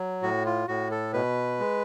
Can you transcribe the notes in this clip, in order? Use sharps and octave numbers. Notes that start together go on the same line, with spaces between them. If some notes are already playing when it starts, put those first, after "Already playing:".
Already playing: F#3
A2 F#4
F4
A2 F#4
A4
B2 B4
G#3